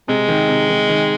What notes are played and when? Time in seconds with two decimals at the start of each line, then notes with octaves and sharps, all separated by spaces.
0.08 C3 G#3
0.28 D#3
0.49 C3
0.69 D#3
0.89 D#3